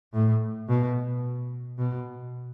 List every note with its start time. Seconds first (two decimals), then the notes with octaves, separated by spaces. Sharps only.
0.14 A2
0.69 B2
1.79 B2